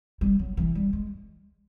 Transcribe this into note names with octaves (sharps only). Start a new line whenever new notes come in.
G3
F#3
E3
G3
G#3